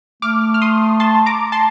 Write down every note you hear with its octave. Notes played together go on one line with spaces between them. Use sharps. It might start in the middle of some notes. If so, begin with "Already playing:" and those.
A3 D6 F6
F6
C6 D#6
A5 C6
A#5 D6
A5 C6